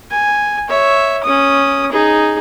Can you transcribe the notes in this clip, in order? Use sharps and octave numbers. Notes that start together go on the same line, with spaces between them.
G#5
C#5 E5
C#4 D#6
D#4 G#4